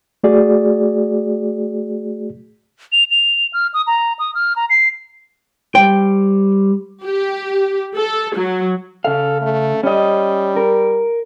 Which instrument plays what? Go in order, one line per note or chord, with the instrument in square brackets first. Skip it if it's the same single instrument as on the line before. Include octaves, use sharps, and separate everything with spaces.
[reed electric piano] A3 F#4 G#4 D5
[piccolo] F7
F7
F6
D#6
A#5
D#6
F6
A#5
C7
[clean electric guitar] G3 C5 [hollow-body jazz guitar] G5
[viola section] G4
A4
F#3
[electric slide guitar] C#3 F5 [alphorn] A4
[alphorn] A3
[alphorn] G3 [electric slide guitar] C#4 D#5
[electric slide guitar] A#4